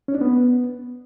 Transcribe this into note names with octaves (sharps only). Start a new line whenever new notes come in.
C#4
D4
B3